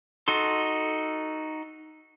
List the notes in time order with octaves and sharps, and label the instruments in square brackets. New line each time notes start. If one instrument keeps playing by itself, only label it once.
[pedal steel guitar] D#4 F#4 A4 C6